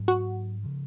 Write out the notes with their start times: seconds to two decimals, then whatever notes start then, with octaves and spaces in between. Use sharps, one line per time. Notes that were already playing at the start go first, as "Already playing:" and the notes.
Already playing: G#2 F#3 A#3
0.08 F#4
0.63 C#3 F3